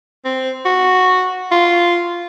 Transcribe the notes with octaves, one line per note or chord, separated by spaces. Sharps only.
C4
F#4
F4